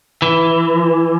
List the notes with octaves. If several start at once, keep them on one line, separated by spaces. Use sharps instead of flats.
E3